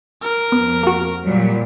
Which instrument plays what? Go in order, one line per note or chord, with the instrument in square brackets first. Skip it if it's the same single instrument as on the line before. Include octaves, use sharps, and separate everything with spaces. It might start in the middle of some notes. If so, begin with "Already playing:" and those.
[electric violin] A#4
[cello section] F2 [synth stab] B3
[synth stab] A#3 F#4
[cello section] A#2 F#3 G3